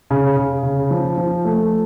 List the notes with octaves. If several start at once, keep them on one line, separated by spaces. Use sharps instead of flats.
C#3
C#3
C#3
F3
F3
A3